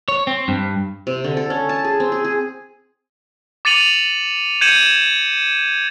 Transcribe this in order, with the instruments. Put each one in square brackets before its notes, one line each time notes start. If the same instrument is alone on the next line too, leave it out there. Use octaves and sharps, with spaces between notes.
[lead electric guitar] C#5
C4
G2
[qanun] C3
D3
A4
C#4
A5
G#4
C4
G#4
G#4
[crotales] D6 A6 C#7 D#7 F7 F#7
G6 G#6 C#7 D#7 E7 F#7